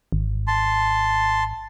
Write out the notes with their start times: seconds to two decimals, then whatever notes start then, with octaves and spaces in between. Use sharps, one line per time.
0.12 G#1
0.47 A5 C6